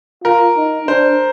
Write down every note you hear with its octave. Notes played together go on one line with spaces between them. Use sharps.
F4 A#4
D#4
D4 C5